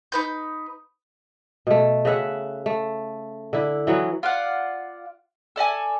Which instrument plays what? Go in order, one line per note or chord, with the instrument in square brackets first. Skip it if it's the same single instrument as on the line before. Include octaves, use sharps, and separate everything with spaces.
[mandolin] D#4 B4 G6
[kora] B2 A3
C#3 B4 E5 F#5
A3
D3 E4
E3 F#3 B3
[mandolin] F4 D5 F5 F#5
A4 D5 D#5 G#5